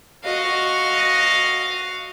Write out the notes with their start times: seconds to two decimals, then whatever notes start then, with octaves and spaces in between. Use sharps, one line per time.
0.24 F#4 D#5 F5